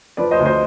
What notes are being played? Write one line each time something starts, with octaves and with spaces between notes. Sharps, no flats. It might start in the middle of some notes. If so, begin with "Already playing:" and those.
F3 B4 D5
C5 D#5
D2
C5 D#5